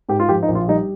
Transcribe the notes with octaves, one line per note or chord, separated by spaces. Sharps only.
G#2 G4
F4
F3 G4
D#4
A#1
F4
G3 D#4